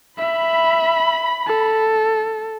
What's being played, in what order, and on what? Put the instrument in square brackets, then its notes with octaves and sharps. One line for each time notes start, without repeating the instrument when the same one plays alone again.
[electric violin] E5 [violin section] B5
[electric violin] A4